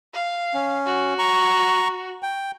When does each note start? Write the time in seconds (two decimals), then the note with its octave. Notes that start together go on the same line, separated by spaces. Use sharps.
0.14 F5
0.54 C#4
0.86 F#4
1.19 A#5 C#6
2.23 G5